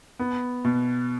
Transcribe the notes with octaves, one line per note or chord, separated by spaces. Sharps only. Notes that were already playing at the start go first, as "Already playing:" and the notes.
B3
B2